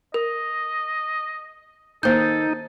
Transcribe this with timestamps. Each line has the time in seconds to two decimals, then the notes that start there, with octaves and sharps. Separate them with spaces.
0.14 A#4 D#5
2.03 D#3 A#3 D#4 A4 C5 G5 G6